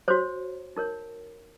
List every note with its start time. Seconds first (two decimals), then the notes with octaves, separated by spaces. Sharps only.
0.08 F#4 C5 C#5
0.76 D#4 A#4 C#5